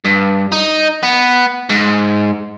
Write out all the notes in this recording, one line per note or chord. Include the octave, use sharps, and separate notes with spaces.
G2
D#4
B3
G#2